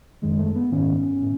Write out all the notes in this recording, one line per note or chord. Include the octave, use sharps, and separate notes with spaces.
F#2 D#3 G#3
A3
B3
G#2 D#3 C#4
A2